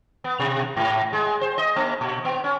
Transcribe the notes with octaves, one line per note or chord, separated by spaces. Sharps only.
B3
B2
G#2
G#3
C5
D#5
A#3
A#2
B3
C#4